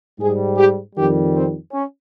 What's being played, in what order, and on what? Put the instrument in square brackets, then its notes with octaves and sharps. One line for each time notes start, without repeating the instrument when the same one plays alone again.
[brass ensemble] G#2 G3 G#4
G4
F2 D#3 G3 G4
C4
C#4